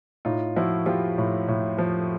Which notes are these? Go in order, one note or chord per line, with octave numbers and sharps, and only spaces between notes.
A2 D#4 F4
F3 E4 F#4
F3 F4 G4
A2
A2
F3